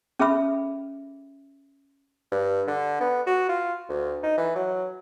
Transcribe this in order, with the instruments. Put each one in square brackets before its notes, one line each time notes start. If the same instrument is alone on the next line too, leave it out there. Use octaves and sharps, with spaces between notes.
[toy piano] C#4 G#4 A4 E5 B5 E6
[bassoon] G2
D3
B3
F#4
F4
D2
D#4
E3
F#3